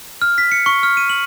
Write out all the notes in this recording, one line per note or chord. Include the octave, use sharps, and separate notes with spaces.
F6
B6
C#7
C#6
F6
D#7
F#7